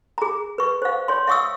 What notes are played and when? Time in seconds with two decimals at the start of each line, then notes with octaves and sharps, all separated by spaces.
0.18 G#4 A#5
0.58 B4 C#6
0.82 C5 F5
1.08 C#5 C6
1.27 E5 F5 C#6 D#6 E6